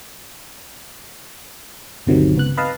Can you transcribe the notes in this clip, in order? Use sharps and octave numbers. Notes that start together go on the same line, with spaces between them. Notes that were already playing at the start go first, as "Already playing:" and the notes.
G1 D2 C3 D#3 F#3
C#2 B3 F#6
B4 D#5 F5 A5